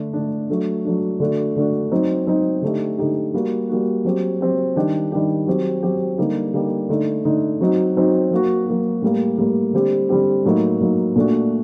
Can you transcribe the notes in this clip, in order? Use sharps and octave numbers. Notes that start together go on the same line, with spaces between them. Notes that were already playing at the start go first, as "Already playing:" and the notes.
Already playing: D3 A3 D4
D3 A3 D4
F#3 A3 D4
F#3 A3 D4
D3 A3 D4 F#4
D3 A3 D4 F#4
F#3 C4 D#4
F#3 C4 D#4
D3 A3 D#4 G4
D3 A3 D#4 G4
G3 A#3 F#4
G3 A#3 F#4
F#3 C4 G4
F#3 C4 G4
D#3 G3 D4 G4
D#3 G3 D4 G4
F#3 C4 G4
F#3 C4 G4
D3 G3 A#3 D#4 G4
D3 G3 A#3 D#4 G4
D3 A3 D#4
D3 A3 D#4
F#3 C4 D#4 F#4
F#3 C4 D#4 F#4
F#3 A#3 F#4
F#3 A#3 F#4
A2 G3 A#3
A2 G3 A#3
D3 G3 C4 G4
D3 G3 C4 G4
A2 F#3 A#3 D#4
A2 F#3 A#3 D#4
A#2 A3 D4 F#4